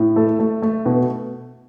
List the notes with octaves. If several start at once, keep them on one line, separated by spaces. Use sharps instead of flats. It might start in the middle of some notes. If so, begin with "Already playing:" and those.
Already playing: A2
A3 A4
A3
A3
B2